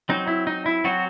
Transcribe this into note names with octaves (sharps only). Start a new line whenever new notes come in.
F#3 C4 D#4
E4
D#4
E4
F#3 C4 F#4